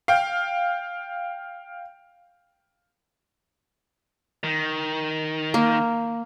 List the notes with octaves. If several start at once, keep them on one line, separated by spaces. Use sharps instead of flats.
F5 G5
D#3
A#3